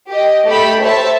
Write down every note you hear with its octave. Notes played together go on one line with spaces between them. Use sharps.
G4 D#5
A3 G4 A4 B5
C5 C#5 E5 A5